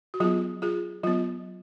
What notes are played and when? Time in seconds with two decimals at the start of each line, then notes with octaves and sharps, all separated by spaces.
0.14 F#4
0.20 F#3 B3 F4 G#4
0.62 F4 G#4
1.03 F#3 B3 F4